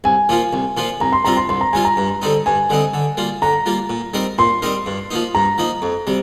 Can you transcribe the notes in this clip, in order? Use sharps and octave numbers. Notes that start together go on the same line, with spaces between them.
C2 G#5
A#2 F3 A#3 F4
C2
A#2 F3 A#3 F4
C2 A#5
C6
C3 G3 C4 F4 A#5
C6
C2 C6
A#5
C3 G3 C4 F4 G#5
A#5
G2
D3 G3 C4 D#4
G2 G#5
D3 G3 C4 D#4
D3
G3 A#3 F4
D3 A#5
G3 A#3 F4
A#2
G3 C4 D#4 A#4
A#2 C6
G3 C4 D#4 A#4
G2
F3 A#3 D#4
G2 A#5
F3 A#3 D#4
F2
C3 G3